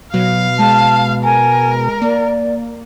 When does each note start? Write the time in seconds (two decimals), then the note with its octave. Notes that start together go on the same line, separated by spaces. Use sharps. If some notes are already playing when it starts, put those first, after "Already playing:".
0.14 B2 F#3 F5
0.59 G#3 A5
1.24 A#4 G#5
2.02 A#3 D5